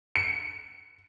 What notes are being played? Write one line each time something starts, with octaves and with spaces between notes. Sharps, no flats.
C#7